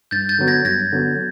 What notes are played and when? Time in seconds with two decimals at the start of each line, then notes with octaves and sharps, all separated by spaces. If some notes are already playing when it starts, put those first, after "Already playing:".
0.11 G2 G6 A6
0.29 G6 A6
0.39 D3 F#3 B3
0.48 G#6 A#6
0.65 G2 G#6 A#6
0.92 D3 F#3 B3